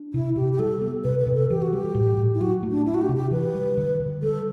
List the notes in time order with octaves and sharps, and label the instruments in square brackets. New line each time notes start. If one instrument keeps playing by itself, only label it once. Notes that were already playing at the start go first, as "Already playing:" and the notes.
Already playing: [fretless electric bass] D4
[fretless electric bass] C3 [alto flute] E4
[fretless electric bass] C3 [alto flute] G4
[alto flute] G4
[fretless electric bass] G3 [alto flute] A4
[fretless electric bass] B3
[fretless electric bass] C3 [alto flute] B4
[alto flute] B4
[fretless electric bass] C3
[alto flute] A4
[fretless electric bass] E3 [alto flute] G4
[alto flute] F#4
[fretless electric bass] G3 [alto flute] G4
[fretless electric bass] A2
A2
[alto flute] E4
[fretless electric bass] F#3 [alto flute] F#4
[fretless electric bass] A3
[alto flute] D4
[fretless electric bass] D4 [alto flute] E4
[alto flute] F#4
G4
[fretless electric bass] C3
[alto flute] G4
[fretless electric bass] E3 [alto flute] B4
[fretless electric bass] G3
D3
D3
[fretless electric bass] G3 [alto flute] A4